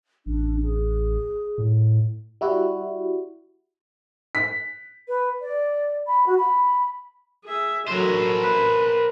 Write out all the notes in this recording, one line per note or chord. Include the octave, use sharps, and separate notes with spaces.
A1 D4
G#4
A2
G3 E4 F#4
B6
B4
D5
B5
F#4
B5
G#4 E5
F#3 A4 A#4 C5
B4